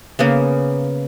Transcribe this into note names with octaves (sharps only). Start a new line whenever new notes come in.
C#3 A#3 B3